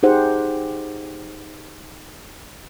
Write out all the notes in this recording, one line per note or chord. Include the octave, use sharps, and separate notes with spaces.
D#4 G4 G#4 C5 F#5